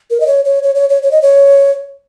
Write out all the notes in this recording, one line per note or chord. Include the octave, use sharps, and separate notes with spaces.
A#4
D#5
C#5
C#5
C#5
C#5
C#5
C#5
D#5
C#5